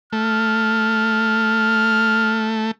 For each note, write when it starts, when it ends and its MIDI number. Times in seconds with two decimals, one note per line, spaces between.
0.13 2.71 57
0.13 2.53 89